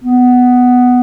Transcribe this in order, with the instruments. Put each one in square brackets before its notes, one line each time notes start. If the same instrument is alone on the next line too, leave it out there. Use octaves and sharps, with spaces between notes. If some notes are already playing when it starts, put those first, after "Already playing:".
[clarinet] B3